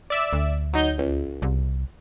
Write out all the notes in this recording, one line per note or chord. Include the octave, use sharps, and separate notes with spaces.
D5 E5 E6
D2
F#3 D#4 G6
C#2
C2